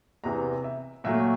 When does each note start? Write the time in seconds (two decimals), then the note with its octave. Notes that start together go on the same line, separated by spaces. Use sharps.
0.24 E2 C3 E3 A#5
0.64 E5
1.04 A#2 F#3 A3 E5